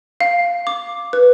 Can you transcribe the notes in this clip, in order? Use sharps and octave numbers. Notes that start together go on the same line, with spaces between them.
F5
D6
B4